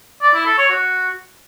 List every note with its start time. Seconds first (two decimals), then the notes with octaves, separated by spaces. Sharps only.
0.22 D5
0.34 E4
0.46 A4
0.58 C#5
0.70 F#4